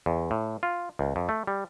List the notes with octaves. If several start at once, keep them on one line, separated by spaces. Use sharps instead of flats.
E2
A2
F4
C#2
F2
A3
G3